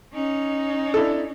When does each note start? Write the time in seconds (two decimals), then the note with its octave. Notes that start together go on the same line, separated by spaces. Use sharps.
0.14 C#4 D#4
0.94 D4 E4 A4